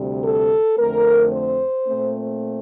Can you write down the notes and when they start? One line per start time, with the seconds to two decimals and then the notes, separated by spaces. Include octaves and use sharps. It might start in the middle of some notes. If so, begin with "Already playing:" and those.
Already playing: D2 C3 G3
0.24 A4
0.78 F2 D3 A3 C4 A#4
1.32 C5
1.87 A#2 A3 C4